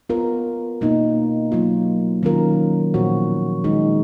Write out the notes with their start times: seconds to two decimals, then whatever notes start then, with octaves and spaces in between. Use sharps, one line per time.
0.09 B3 F4 A#4
0.81 B2 A#3 D#4
1.52 F#3 A#3 F4
2.23 D#3 F#3 C#4 F4 A#4
2.94 A#2 F3 B3 F#4 C#5
3.64 D#3 G#3 D#4 G#4